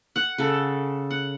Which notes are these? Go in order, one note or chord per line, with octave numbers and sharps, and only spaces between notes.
F#5
C#3 A4
F#5